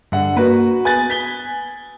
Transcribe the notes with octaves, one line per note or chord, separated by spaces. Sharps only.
G2 D3 F#5
A#3 F#4 B4
B3 G#5 F#6 A6
G#5 B6 G7